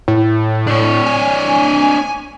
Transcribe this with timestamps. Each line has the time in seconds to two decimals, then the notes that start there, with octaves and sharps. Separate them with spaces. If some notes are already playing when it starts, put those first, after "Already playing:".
0.08 A2
0.67 D4 C#5
1.06 G#5